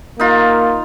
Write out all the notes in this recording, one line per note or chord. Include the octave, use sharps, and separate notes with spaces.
A#3 D#4 F4